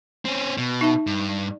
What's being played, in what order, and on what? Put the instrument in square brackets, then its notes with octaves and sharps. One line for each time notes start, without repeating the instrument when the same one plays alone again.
[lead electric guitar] C4 C#4
B2
[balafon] D#4 E5 A5
[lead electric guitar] G2